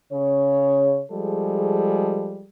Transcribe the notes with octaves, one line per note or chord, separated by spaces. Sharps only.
C#3 C#5
F3 G3 G#3 G#4 A4